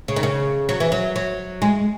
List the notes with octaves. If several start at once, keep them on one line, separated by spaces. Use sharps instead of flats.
C#3
D#3
C#3
F#3
E3
F#3
F#3
G#3